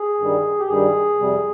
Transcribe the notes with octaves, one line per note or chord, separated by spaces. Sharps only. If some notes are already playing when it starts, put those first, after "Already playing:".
Already playing: G#4
G2 D#3 G3
G4
G2 D#3 G3 G#4
F2 C3 G3